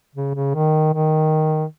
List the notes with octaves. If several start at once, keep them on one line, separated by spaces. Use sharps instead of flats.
C#3
C#3
D#3
D#3